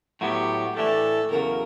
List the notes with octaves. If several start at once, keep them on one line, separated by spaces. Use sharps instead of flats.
A2 F#3 B3 G4
A2 E3 A3 D4 G4 A4
E2 C#3 F#3 A#4